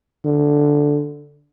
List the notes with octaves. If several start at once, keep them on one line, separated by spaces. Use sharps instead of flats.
D3